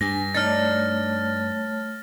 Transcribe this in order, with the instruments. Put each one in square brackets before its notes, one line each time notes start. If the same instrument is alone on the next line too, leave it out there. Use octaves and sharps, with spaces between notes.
[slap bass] G2 [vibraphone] D4 G#5 [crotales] A#6
[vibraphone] A3 C#5 A5 [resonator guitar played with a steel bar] D4 D#4 [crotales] F6 A6